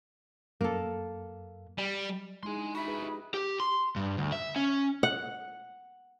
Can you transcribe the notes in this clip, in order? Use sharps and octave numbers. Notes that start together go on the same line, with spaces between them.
F#2 A#3 A4
G3
G#3 D#4 E4 G#4 G#5 C6
D4
F#4 E5 B5
F4 G#4 B4
G4 D#5
G4
C6
G2
D2
E5
C#4
F#5